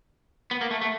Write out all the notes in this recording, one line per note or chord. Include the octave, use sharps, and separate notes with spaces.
B3
A#3
A3
A3